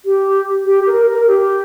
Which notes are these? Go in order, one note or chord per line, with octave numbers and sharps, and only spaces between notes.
G4
G4
A#4
A#4
G4